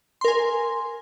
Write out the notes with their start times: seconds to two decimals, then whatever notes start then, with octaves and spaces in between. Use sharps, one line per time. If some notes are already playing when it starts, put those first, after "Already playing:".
0.21 C6
0.25 A#4
0.28 G#5